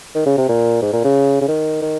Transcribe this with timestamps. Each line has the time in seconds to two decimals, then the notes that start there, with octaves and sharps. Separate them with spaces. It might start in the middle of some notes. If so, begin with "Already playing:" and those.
0.15 D#3
0.26 C#3
0.37 C3
0.49 A#2
0.82 G#2
0.93 A#2
1.04 C#3
1.41 C#3
1.48 D#3
1.82 D#3